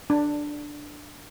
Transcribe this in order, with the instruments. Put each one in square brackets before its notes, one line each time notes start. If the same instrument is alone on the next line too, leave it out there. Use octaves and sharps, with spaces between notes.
[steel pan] D4